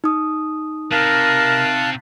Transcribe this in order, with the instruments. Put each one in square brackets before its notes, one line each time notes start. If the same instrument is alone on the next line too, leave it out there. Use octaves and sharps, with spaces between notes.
[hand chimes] D#4 D#6
[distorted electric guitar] C3 [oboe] A#4 [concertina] F5 A5 F#6